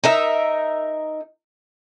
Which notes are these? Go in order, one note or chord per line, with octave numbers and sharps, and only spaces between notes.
D#4 A#4 E5